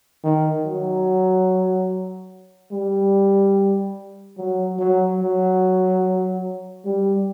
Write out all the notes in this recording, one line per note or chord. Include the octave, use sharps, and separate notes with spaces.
D#3
F#3
G3
F#3
F#3
F#3
G3